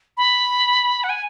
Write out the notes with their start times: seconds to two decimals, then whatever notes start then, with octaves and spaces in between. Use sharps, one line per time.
0.17 B5
1.04 F#5
1.09 G#5